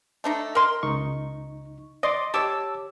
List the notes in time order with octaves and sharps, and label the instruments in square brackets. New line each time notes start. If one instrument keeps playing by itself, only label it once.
[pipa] A3 D4 D#4
A#4 C6
[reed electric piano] C#2 D#4 C#6
[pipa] D5 [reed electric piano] D#5 C6 D6
[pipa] G4 C#5 [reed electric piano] A5 D6 E6